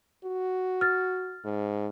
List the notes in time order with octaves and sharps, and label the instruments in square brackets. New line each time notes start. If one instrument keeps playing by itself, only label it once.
[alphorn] F#4
[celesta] F6 A6
[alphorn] G#2